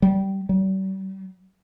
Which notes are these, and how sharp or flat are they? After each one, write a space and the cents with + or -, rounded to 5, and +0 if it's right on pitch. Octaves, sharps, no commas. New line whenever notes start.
G3 -20
G3 -40